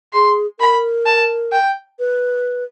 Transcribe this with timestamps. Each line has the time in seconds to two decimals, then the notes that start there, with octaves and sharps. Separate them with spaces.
0.13 G#4 C6
0.60 A#4 B5
1.06 A5
1.52 G5
1.99 B4